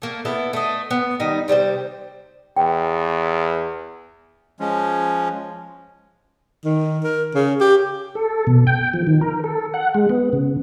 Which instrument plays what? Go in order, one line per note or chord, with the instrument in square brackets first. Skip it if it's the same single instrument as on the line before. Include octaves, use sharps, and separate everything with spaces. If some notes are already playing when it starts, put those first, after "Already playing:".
[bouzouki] A3 A#3
B3 E4 A4
A3 D#5
B3
D#3 G3 D#4
C3 G3 A#4 C5
[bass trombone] E2 [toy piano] G5
[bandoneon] F3 G#3 C#4
[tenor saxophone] D#3
A#4
C#3
G4
[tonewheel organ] A4
B2
G5
F3
D#3
A#4
A4
F#5
G#3
B3
C#3